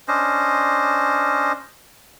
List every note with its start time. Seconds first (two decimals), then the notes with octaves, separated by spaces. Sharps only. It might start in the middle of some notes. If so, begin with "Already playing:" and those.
0.08 C#4 D4 C5 D#5